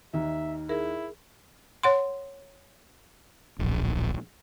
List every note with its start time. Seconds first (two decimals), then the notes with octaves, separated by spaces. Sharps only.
0.14 D#2 D#4 E5
0.69 E4 G#4 A#4
1.83 C#5 F#5 C6
3.59 D1 A#1